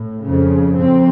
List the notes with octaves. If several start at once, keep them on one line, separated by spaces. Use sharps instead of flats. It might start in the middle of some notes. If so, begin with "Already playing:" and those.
Already playing: A2
F2 C#3
F2 C4